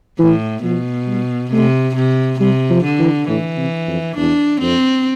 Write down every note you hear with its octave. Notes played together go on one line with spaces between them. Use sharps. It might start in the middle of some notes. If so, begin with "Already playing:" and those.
A2 E3
B2 F3
G3
C3 A3
C3
C3 G3
F3
D3
E3
A2 E3
C3
F2
E2 D4
F2 C4